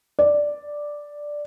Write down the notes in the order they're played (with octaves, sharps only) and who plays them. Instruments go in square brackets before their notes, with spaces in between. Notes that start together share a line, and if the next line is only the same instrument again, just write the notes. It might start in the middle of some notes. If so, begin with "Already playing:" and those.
[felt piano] D5